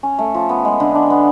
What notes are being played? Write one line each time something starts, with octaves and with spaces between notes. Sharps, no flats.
C#4
A3
F3
B3
G#3
D3
D4
B3